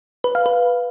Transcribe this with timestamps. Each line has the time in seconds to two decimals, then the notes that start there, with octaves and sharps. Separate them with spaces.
0.24 B4
0.35 F5
0.46 B4